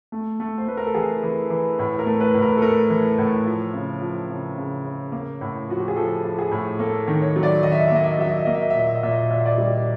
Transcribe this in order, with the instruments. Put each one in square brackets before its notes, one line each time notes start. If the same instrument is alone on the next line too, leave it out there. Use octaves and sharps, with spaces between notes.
[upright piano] A3
A3
C5
A3 B4
A#4
A4
E3 G#4
E3
E3
A2
A#4
A3
B4
A2
A#4
A4
A3 A#4
E3
A2
F3
C#3
F3
C#3
C#3
C#3
A#3
A2
F3 F#4
G4
G#4
F3 A4
F3
G#4
A2
A#3 A4
D#3
C#5
F#3
D5
D#3 D#5
E5
D#5
E5
A#3 D#5
E5
D#5
F#3 E5
D#5
E5
A#3 D#5
E5
D#5
E5
A#2 D#5
E5
D#5
A#2 E5
D#5
A#2 E5
D#5
D5
D#5
G3